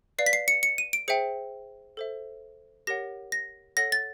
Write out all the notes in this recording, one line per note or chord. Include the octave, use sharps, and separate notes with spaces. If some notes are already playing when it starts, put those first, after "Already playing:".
B4 D5 F5 C7
B6
C7
C#7
C#7
D#7
D7
G#4 C5 E5 G5 C#7
A4 C5 E5
G4 A#4 C#5 F#5 A#6
A#6
A4 C#5 F#5 A#6
A6